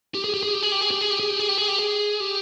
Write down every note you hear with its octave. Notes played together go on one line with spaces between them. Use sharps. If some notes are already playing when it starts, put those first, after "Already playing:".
G4
G#4
G4
G#4
G4
G#4
G4
G#4
G4
G#4
G4
G#4
G4
G#4
G4
G#4
G4
G#4
G4